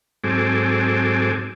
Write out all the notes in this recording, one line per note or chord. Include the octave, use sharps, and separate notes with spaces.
G#2 F#3 C4 A4 G#5 D6